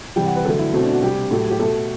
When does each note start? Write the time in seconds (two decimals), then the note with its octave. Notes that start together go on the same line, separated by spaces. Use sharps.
0.16 C3 E3 G3 G5
0.26 F#5
0.36 B4
0.45 D3 F#3 A3 A4
0.59 E4
0.73 B2 A3 C4
0.83 D4
0.93 F#4
1.02 C3 G3 G4
1.31 A2 F#3 A3
1.51 G4
1.59 B2 A3 A4